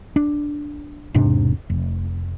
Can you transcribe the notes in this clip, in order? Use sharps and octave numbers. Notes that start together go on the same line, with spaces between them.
D4
E1 G#2 C3 D4
F1